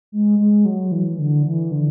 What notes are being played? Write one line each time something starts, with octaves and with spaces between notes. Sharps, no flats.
G#3
G#3
F#3
E3
D3
E3
D3